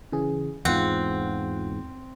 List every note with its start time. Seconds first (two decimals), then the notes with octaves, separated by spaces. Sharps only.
0.12 C#3 E3 G#4
0.65 E2 G#2 C4 F4 F#5